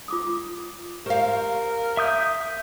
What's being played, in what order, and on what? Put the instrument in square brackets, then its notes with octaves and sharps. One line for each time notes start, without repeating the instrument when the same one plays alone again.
[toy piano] F4 D6 D#6
[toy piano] G4 [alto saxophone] A#4 [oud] C5 F5
[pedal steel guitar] E5 D#6 G6